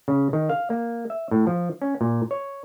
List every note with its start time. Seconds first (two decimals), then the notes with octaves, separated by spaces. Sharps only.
0.08 C#3
0.33 D#3
0.49 F5
0.70 A#3
1.10 E5
1.31 A2
1.47 F3
1.82 C#4
2.01 A#2
2.31 C#5